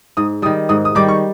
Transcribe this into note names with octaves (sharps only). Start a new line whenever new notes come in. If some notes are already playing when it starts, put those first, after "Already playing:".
G#2 D#6
D#3 G3 D#6
G#2 D#6
D#6
D#3 G3 D6
C#6